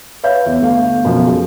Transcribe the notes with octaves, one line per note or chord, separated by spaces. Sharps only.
B4 C#5 E5 F5 G6
E2
G1 A3 F5
F#2 B2 F3
G#4